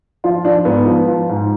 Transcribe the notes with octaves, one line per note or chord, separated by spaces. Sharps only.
F3 F4
F3 D4
G#2 B3
F3
F3
G#2